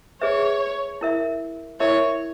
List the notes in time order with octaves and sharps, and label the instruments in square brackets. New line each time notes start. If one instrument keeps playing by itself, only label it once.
[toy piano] G#4 B4 E5 [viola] C#5
[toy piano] E4 A#4 E5
[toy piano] E4 A#4 E5 [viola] C#5